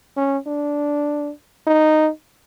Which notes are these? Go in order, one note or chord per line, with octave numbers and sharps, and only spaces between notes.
C#4
D4
D#4